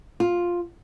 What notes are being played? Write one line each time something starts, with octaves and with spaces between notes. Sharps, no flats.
F4